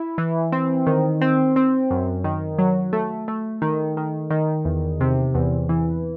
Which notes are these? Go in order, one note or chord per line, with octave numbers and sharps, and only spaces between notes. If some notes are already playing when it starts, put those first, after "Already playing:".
Already playing: E4
E3
C4
D#3
C4
C4
F#2
D#3
F#3
A3
A3
D#3
D#3
D#3
E2
C3
E2
E3